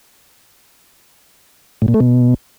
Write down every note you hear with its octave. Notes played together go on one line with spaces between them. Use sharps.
A2
A#2
A3
B2